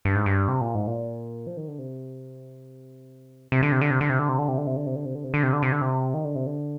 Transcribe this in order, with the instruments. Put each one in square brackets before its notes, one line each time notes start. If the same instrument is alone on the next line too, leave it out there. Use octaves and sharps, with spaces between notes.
[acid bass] G2
G#2
G2
C3
A#2
G#2
A#2
F3
D#3
D3
C3
C3
D3
C3
D3
C3
D3
C3
D3
C3
D3
C3
D3
C3
D3
C3
D3
C3
D3
C3
D3
C3
D3
C3
D3
C3
D#3
D3
C3
D3